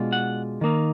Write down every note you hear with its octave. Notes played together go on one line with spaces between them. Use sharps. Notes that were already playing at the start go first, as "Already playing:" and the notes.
Already playing: B2 G#3 D4 F4
F#5
D#3 A#3 D#4